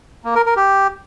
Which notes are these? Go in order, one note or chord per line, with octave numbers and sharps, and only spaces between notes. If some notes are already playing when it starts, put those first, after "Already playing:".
A#3
A#4
A#4
G4